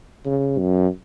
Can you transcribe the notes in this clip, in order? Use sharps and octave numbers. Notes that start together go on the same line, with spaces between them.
C#3
F#2